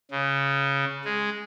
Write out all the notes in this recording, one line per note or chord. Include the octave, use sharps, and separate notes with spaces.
C#3
G#3